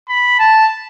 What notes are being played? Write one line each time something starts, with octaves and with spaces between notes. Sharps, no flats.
B5
A5